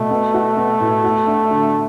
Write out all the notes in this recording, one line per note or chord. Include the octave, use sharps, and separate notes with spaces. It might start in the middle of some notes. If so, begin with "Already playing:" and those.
Already playing: B2 A3
B3
F#4
B3
A2
F#4
D4
D3